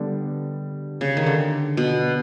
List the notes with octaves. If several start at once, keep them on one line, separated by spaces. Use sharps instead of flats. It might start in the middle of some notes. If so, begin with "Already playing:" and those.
Already playing: D3 G3 B3 D4 G4
C#3
D#3
D3
B2